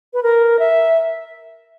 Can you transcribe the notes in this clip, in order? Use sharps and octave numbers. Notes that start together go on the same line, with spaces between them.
B4
A#4
E5